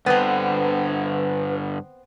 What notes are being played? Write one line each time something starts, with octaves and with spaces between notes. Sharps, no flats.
G2 D3 B3 C4 B4